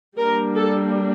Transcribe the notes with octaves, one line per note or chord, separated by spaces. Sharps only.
G3 A#3 D4 A#4
A4